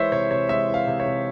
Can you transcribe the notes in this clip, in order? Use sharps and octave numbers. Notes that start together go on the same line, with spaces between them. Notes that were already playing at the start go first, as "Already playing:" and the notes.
Already playing: E3 G#3 C5 C#5 E5
C3 C#5
C3 C#5
G#3 E5
E3
F5
C3
C#5
C3